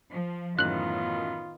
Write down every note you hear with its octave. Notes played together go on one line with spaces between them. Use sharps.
F3
F#2 A2 D#3 E3 B3 F4 F#6 F#7